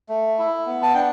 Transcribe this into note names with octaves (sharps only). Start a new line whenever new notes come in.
A3
E4
B3
A5
D4 G5